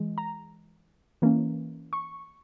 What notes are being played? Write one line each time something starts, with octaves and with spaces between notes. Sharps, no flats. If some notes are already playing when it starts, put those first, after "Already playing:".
Already playing: E3 G#3
A#5
E3 A#3 C#4
C#6